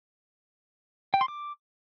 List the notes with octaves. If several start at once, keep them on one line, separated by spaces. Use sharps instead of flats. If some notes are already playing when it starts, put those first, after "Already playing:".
G5
C6
D6